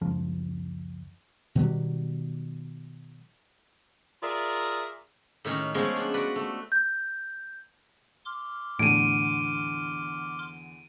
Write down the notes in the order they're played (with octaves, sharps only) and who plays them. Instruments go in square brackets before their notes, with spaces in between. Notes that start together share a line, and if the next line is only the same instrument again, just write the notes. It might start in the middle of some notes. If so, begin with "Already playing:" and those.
[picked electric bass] C#2 F#2 F3
[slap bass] B2 D#3 F#3 G3
[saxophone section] F4 G#4 A#4 D5 E5
[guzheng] A2 D#3 C#4
F3 G#3 A3 B3 C#4 G#4
D4
F#4 B4 D5 F#5
A3
[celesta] G6
[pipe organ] C6 D6 F6
[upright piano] E2 D3 [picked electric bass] A2 [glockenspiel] D7 D#7